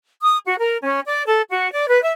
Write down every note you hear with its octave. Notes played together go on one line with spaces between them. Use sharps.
D#6
F#4
A#4
C#4
D5
A4
F#4
D5
B4
E5